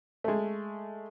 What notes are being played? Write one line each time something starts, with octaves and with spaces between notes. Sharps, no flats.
G#3 A3